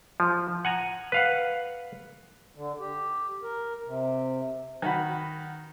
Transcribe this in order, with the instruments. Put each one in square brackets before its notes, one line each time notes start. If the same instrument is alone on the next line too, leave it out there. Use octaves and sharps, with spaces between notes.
[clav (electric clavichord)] F3
F#5 G#5 A#5
B4 F5 F#5
[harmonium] D3
G4
A#4
C3
[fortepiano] D#3 F#4 B5